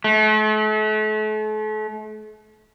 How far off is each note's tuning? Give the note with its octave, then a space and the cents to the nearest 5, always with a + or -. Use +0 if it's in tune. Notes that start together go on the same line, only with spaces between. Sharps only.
A3 -40